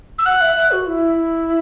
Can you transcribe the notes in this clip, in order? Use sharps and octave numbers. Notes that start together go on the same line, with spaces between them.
E6
F#5 F#6
E5
E5
F#4
E4